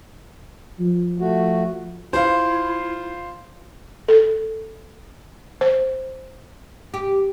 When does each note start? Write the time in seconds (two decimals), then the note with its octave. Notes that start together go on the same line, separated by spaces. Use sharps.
0.80 F3
1.20 A3 F#4
2.13 E4 F4 C5 F5
4.08 A4
5.61 C5
6.94 G4